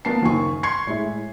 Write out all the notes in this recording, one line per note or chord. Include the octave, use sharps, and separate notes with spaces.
A#3 B3 A5 C7
F#1 D#2 A#3 G#5 C#6
C6 C#6 G#6 C7 C#7
A2 G#3 E4